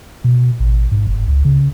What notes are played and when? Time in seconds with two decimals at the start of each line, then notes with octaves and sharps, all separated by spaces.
0.24 B2
0.60 A1
0.91 G#2
1.07 F#1
1.28 C#2
1.45 C#3